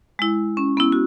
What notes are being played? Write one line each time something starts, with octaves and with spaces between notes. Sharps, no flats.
G#3 E4
C#4
B3 C#4 E4
F#4